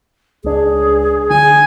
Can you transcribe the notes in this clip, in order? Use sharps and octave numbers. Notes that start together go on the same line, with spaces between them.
C#2 D4 G#4
D3 G#5